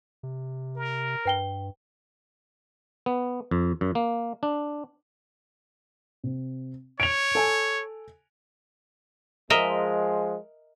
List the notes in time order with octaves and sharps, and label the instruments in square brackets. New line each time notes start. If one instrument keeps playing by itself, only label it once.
[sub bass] C3
[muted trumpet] A#4
[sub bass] G2 [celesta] B4 G5 G7
[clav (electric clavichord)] B3
F2
F#2
A#3
D4
[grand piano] C3
[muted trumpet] C#5 [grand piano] D7 F7
[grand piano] A4 G#5
[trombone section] F3 G#3 [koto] A#4 D#5 E5